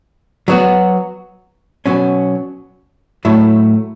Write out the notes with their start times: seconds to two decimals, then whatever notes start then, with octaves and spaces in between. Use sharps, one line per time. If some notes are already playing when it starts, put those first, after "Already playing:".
0.48 F#3 B3 F#4
1.86 B2 F#3 C#4
3.25 A2 F#3 A3 E4